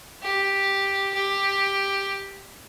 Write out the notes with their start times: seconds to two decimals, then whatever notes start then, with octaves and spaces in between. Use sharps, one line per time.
0.23 G4
1.14 G4